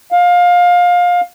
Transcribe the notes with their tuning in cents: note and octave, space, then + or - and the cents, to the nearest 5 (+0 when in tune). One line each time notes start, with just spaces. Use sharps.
F5 +20